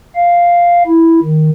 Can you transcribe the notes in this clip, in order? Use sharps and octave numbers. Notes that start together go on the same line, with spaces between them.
F5
E4
D#3